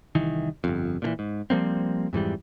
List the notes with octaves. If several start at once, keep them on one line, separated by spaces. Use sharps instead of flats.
C2 D#3 E3
G1 F2
A#2 D3 E3
G#2
F3 G3 A#3 C4
F2 G#2 E3 G3